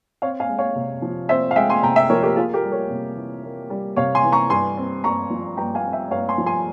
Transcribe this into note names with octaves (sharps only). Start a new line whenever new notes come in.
C4 C#5 F5
F5 G#5
G#3
C#5 F5
C3
F3
C4 C5 E5
F5
G#3 E5 G5
G#5 C6
C3 G5 A#5
E5 G5
F3 A#4 C#5
G4 A#4
A#3 F4 G#4
G4 A#4
G3
A#4 C#5
C3
E3
A#3
G3
C3 C#5 F5
G#5 C6
E3
A#5 C#6
G2 G#5 C6
C4
G2 A#5 C#6
F3
G2 G5 A#5
F5 G#5
C4
E5 G5
G2 C#5 F5
G#5 C6
F3
G#5 C6